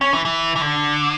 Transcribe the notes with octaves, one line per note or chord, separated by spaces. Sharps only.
C#4
E3
E3
E3
D3